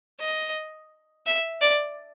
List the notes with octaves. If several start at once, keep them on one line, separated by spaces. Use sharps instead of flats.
D#5
E5
D5